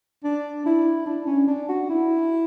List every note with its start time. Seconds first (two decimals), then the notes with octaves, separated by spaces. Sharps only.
0.24 D4
0.66 E4
1.06 D4
1.27 C#4
1.48 D4
1.69 F#4
1.90 E4